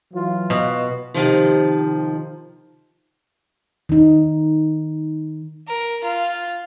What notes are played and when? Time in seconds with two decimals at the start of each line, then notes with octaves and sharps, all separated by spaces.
0.13 E3 F#3 F4
0.50 B2
1.14 C3 D#3 F3
3.89 D#3 D#4
5.68 A#4
6.04 F4